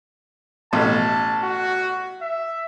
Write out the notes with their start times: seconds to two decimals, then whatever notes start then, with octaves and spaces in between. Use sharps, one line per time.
0.73 A1 B2 A5
1.43 F#4
2.22 E5